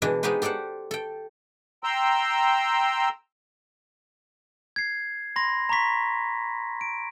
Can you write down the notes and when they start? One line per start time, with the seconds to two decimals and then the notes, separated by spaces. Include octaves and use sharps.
0.02 B2 E3 G#3 D4 E4
0.23 G#3 B3 D#4 G4 B4 C5
0.42 G4 A4 C5 D5 F#5
0.91 A4 G5
1.84 G5 A#5 C6 E6
4.76 G#6 C7
5.36 B5 C6 A#6
5.69 A#5 B5 C#6 B6
6.81 D7